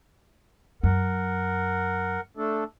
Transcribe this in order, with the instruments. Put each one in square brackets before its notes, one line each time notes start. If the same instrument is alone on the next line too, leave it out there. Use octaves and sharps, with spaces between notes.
[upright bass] F#2 [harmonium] A#4 F#5
[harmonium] A3 D4 A4